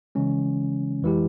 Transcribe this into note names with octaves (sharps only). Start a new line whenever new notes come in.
C#3 E3 G#3 C#4
F2 E3 G#3 E4 G4